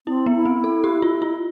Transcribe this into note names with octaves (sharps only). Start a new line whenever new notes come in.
C4 E4
B3
E4
C4
A4
G4
F4
F4